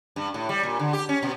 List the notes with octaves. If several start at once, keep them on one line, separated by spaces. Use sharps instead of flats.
G2
A2
G3
A#2
D3
G4
C#4
B2